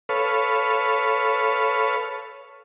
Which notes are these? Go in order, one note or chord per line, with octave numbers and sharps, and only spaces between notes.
A4 B4 C#5 F5